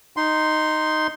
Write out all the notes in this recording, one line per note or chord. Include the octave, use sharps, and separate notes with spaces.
D#4 C6